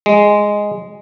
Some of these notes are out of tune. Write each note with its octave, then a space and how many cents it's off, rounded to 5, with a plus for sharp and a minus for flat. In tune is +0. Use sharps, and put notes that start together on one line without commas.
G#3 -5